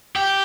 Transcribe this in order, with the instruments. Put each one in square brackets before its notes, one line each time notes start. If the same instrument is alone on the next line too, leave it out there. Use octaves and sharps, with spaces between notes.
[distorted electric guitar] G4